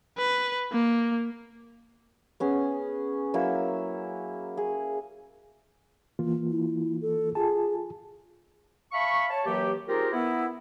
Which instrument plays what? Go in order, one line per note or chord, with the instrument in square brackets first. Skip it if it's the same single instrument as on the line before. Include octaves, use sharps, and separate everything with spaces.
[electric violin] B4
A#3
[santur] B3 C#4 G#4
F#3 A#3 E4 E6
G#4
[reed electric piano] E3 A#3 F4
[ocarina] E4
A4
[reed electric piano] F4 G#5 A5 [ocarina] G#4
[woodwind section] E5 F5 A5 B5 C#6
C#5 A5
F#2 E3 F#3 A#3 G4
C4 D#4 F4 G4 G#4 A#4
B3 E4